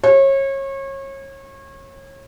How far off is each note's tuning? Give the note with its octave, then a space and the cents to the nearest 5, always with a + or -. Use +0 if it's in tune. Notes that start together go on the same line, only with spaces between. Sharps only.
C#5 -30